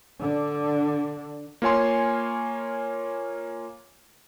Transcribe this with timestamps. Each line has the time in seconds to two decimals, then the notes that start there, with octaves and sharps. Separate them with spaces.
0.20 D3 D4
1.62 A#3 F4 C#5 G#5 C6